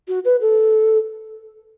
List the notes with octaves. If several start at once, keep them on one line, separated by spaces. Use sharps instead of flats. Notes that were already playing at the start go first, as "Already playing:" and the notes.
F#4
B4
A4